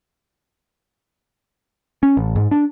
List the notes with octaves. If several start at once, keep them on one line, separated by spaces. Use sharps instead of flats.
C#4
A1
G#2
D4